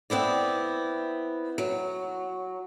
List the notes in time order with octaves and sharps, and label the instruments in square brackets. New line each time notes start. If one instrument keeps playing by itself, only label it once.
[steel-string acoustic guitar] B3 C4 E4 D5
F#3